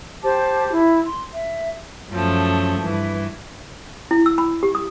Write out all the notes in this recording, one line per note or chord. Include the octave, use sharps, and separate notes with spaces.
G4 C5 A5 D6
E4
C6
E5
F#2 F3 A3
G2 E3
E4
E6
B5
G4
D#6